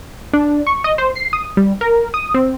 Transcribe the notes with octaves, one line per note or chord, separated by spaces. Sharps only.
D4
C#6
D#5
C5
C7
D#6
G3
A#4
D#6
C4